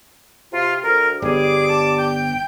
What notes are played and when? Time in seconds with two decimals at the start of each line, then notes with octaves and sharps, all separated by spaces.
0.52 C3 F4
0.83 D2 A#4
1.22 G1 G3 G#4 D6
1.68 A5
1.98 G5